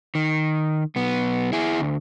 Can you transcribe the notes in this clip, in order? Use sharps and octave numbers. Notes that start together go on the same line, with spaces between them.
D#3
B1 B3
E4 G#4
D2